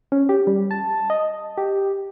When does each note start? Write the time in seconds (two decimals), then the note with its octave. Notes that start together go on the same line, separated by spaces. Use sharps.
0.12 C#4
0.29 G4
0.47 G3
0.71 A5
1.10 D#5
1.58 G4